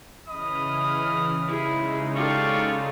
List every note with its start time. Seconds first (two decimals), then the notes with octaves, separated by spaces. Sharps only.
0.28 C#3 E3 D#5 B5 D#6 F6
1.48 C#3 G#3 D#4 E4 G#4
2.16 F4 G4 A4 D5 C#6